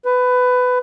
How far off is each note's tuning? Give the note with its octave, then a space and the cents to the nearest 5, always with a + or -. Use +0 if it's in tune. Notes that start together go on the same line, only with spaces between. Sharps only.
B4 +20